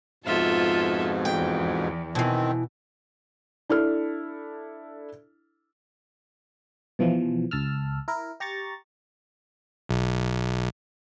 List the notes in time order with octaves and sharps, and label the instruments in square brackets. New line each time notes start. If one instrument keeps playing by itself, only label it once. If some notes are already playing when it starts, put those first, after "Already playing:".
[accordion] F2 G#2 B2 [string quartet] F4 A4 E5
[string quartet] E2 [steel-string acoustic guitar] G5
[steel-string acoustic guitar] B2 E3 [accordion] D#3 C4
[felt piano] D4 E4 A4 F6
[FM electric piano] B2 E3 F3
C#2 A5 E6 F6
E4 A#4
G4 A#5 C#6 A6
[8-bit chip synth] B1